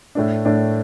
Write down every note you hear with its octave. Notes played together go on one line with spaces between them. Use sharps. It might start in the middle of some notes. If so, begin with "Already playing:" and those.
A2 A3 D4
A2 A3 D4